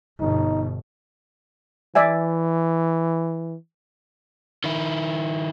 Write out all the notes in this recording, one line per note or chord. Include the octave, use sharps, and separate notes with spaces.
G1 B2 D#4
E3 D5 E5 G#5
D#3 E4